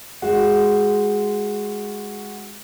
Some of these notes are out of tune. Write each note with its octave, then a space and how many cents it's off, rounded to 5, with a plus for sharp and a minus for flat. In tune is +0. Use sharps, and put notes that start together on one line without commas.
G#3 +0 F#4 +0